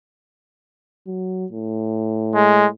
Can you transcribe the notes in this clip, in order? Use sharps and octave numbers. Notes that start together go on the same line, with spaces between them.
F#3
A2
G#3